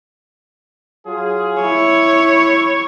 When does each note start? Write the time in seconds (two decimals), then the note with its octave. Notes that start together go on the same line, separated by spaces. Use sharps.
1.06 F#3 F4 G#4
1.61 E4 C#5